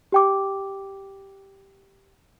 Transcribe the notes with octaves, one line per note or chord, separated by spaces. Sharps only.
G4 G5 D6